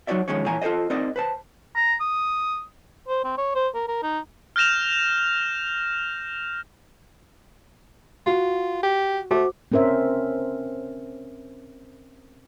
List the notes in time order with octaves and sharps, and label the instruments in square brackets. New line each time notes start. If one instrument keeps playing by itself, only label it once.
[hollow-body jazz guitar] F#3 D#4 F#4 C#5 D5 E5
B1 D#3 F3 G#3 C#4 C#5
A#2 E3 C#5 G#5 A#5
F4 A4 A#4 C5 D#5
C4 D#4 A#4 C5 D5 D#5
B4 C5 A5
[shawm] A#5
D#6
[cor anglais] C5
C4
C#5
C5
A#4
A#4
D#4
[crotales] F6 G6 A#6 E7 F7
[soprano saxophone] F4 [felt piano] F#4
[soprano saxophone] G4
[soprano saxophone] A3 [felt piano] F#4 C5 D6
[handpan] C4 C#4 A#4 C5 E5